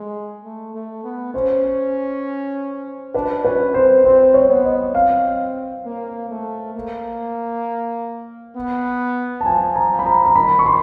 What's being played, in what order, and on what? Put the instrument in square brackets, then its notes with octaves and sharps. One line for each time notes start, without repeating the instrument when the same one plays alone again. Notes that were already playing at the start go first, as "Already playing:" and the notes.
Already playing: [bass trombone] G#3
A3
A3
B3
[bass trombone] C#4 [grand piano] C5
[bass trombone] D4 [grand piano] B4
[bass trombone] C#4 [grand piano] B4
[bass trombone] C4 [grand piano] C5
[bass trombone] C4 [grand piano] C5
[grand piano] C#5
[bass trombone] B3
[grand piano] D#5
[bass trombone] C4 [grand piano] F5
[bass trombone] A#3
A3
A#3
B3
[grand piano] A5
[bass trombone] F3 [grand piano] G#5
[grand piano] A#5
[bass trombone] F3
[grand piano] B5
A#5
A#5
[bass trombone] D#3 [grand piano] B5
[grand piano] C#6
C6